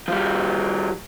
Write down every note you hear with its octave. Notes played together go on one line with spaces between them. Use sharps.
F3 G3